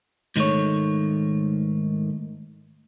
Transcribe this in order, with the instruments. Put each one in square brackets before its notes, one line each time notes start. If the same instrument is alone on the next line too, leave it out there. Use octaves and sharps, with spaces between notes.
[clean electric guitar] G#2 D#3 F3 A3 C#5